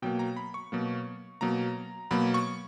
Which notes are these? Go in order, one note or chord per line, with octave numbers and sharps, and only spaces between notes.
B2 F#3 A#3 G5
A#5
B5
C#6
B2 F#3 A#3
B2 F#3 A#3 A#5
B2 F#3 A#3 B5
C#6